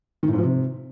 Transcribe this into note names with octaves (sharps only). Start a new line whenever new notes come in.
D#3
A2
G#2
F3
C3